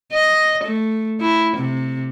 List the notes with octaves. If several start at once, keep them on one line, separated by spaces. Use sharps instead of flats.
D#5
A3
E4
C3